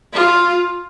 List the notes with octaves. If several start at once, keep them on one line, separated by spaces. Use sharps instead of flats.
F4